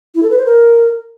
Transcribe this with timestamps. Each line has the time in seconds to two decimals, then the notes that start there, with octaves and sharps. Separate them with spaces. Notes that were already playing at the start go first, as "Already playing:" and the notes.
0.15 E4
0.23 A4
0.30 B4
0.38 C5
0.46 A#4